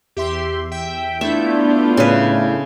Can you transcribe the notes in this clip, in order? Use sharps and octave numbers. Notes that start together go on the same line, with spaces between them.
E2 G4 E5 C6
E5 G5
A3 B3 D4 E4 F4 E5 G6
A2 C#3 B4